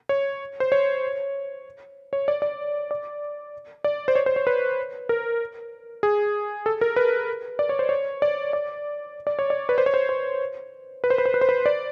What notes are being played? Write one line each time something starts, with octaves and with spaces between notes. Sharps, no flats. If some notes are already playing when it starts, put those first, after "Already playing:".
C#5
C5
C#5
C#5
D5
D5
D5
D5
C5
C#5
C5
C#5
B4
A#4
G#4
A4
A#4
B4
D5
C#5
C5
C#5
D5
D5
D5
C#5
D5
B4
C5
C#5
C5
C5
B4
C5
B4
C5
B4
C5
B4
D5